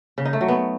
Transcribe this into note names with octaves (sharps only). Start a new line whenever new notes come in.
C#3
D#4
A3
F#3
B3